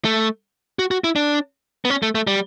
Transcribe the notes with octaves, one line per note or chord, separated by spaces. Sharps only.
A3
F#4
F#4
E4
D4
B3
C#4
A3
A3
G3